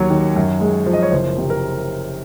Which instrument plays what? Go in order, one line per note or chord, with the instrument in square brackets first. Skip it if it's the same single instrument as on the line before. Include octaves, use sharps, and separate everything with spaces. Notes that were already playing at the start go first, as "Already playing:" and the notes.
Already playing: [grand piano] D#2 F#3 C#5
D#3
F#2
G#3
F3
D#5
C#5
F#1 C5
C3
A#4